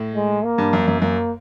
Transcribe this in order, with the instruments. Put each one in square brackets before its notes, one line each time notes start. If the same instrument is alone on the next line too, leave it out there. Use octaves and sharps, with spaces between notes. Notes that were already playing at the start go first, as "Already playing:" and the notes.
Already playing: [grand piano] A2
[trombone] G#3
A#3
[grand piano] G2
F#2
F#2
[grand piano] F#2 [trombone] A#3